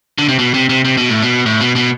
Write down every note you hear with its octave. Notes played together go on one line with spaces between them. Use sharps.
D3
C3
B2
C3
C3
C3
B2
A2
B2
A2
B2
B2